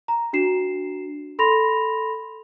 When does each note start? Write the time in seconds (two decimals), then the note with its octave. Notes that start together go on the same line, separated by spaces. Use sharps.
0.08 A#5
0.33 D4 F#4 C7 E7
1.39 A4 B5 C6 A#6 F7